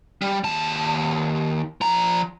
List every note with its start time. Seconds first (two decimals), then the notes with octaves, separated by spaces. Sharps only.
0.22 G3
0.44 D#2 A5
1.81 F3 A#5